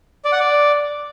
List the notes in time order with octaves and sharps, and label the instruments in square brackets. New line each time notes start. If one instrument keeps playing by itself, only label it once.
[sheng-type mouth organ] D5
F#5
D5